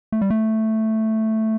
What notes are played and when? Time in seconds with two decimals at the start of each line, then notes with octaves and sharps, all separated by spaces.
0.12 A3
0.21 G3
0.30 A3